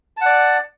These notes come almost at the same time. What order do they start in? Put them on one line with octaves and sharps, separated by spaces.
A5 F#5 D5